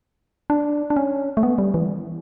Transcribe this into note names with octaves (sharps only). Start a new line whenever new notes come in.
D4
D4
C#4
A3
B3
G3
E3